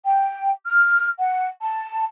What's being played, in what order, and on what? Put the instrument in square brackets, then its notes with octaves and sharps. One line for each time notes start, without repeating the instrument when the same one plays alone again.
[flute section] G5
F6
F#5
A5